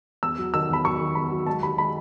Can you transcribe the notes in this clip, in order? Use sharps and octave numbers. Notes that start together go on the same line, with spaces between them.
E2 E6
F#3
D#3 E6
E2 B5
F#3 C#6
D#3
E2 B5
F#3
G#3 A5
D#2 B5
G#3 B5